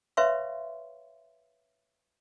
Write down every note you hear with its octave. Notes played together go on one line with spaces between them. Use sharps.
B4 C#5 E5 F5 C6 C#6